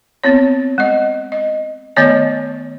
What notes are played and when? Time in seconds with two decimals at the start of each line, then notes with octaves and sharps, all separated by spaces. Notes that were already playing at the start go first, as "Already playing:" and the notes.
0.24 B3 C4 C#5
0.78 G#3 D#5
1.32 D#5
1.96 D#3 A3 B3 C#5 D#5 G#5